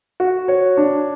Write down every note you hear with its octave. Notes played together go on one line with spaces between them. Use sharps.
F#4
C#5
D4